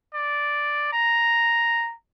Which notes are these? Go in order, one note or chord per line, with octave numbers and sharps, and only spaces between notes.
D5
A#5